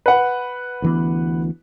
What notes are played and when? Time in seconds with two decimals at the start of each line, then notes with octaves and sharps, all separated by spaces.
0.06 B4 F#5
0.82 D2 E3 B3